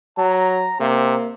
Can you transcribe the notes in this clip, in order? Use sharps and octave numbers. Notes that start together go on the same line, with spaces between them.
F#3 A#5
C3 A#3